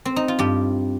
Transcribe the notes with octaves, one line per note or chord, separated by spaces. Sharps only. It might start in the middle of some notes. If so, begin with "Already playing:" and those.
C4
D#4
F4
G2 G4